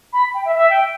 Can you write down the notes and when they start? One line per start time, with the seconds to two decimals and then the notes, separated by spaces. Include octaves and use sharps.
0.13 B5
0.34 G5
0.45 E5
0.56 E5
0.70 G5